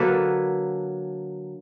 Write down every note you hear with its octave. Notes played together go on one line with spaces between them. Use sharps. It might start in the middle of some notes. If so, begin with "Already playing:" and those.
Already playing: D3 F#3 A#3 A4 B4